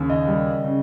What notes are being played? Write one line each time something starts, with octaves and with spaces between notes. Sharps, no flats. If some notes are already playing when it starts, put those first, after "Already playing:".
Already playing: D#2 C#3
D#5
G3
C#3